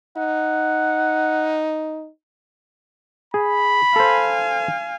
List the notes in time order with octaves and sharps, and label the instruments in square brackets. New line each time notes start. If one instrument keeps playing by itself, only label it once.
[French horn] D#4 [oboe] F#5
[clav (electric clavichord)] G#4 [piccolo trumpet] B5
[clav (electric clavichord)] A4 C5 [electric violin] F5 G#5